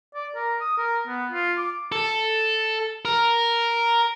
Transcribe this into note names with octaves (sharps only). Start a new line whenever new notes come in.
D5
A#4
D#6
A#4
B3
F4
D6
A4
A#4